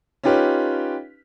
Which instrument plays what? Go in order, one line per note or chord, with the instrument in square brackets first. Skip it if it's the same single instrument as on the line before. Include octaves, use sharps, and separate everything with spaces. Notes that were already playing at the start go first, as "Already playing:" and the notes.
[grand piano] C#4 D#4 F4 G4 B4